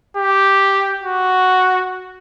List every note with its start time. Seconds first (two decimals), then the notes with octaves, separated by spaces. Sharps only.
0.17 G4
1.04 F#4